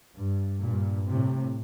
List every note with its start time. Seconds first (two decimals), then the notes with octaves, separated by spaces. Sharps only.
0.16 G2
0.62 G2 A#2
1.08 A2 C3